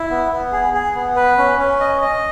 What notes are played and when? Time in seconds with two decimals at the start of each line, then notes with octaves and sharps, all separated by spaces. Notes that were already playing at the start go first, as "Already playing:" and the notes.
Already playing: E4
0.10 B3
0.31 B3
0.52 G#4
0.74 G#4
0.95 B3
1.16 B4
1.38 C#4
1.59 C#4
1.80 D#5
2.01 D#5